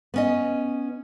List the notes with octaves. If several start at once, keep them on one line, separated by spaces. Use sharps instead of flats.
B3 C#4 D#5